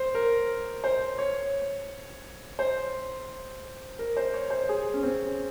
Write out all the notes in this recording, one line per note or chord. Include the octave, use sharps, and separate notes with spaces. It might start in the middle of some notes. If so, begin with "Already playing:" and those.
Already playing: C5
A#4
C5
C#5
C5
A#4
C5
C#5
C5
G#4
C#4
C4